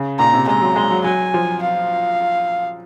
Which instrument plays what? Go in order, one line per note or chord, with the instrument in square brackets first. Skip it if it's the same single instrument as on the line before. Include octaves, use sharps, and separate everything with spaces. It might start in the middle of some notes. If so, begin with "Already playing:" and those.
Already playing: [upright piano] C#3
[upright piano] A#2 [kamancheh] A#5
[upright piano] C3
[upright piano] G#3 [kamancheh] A#5
[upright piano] F#3
G#3
F#3
[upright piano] F#3 [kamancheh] G#5
[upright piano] F3
[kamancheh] F5